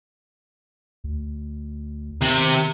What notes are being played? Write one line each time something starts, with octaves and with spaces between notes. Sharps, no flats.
D2
C3 D#3